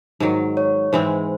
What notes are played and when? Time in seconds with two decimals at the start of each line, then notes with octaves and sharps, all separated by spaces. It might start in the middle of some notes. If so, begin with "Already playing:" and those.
0.20 G#2 D#3 F#3
0.57 C#5
0.93 G#2 E3 G#3 C4 C5